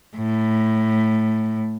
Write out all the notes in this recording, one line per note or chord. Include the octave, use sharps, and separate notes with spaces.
A2